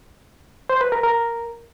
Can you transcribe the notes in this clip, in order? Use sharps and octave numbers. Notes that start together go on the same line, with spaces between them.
C5
B4
A#4
A#4